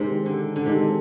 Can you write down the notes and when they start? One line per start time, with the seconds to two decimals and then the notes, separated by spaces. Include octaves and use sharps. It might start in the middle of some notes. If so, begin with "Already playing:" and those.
Already playing: C3 D#3 G#3 C4 D#4
0.26 D3
0.56 D3
0.65 C3 D#3 G#3 C4 D#4